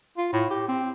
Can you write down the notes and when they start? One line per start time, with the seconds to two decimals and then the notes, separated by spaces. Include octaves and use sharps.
0.17 F4
0.32 A2
0.51 G4
0.68 C4